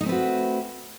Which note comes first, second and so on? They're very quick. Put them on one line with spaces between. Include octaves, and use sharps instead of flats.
D#4 A3 C4 B4 F#4